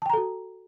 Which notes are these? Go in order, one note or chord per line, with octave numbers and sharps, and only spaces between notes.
F#4 A4 G5 A5 A#5